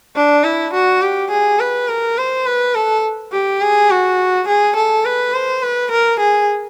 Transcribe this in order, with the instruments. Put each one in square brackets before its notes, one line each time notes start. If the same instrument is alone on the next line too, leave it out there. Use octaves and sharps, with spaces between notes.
[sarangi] D4
E4
F#4
G4
G#4
B4
A#4
C5
B4
A4
G4
G#4
F#4
G#4
A4
B4
C5
B4
A#4
G#4